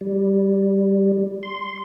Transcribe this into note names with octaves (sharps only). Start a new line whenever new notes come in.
G3
C6